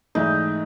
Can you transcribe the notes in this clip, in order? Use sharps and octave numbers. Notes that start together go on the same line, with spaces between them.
G#2 E3 A3 D#4